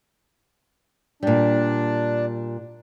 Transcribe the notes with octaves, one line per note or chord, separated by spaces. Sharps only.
A#2 G3 D4